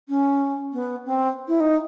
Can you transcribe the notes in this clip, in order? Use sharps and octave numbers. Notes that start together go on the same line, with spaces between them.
C#4
B3
C4
E4
D#4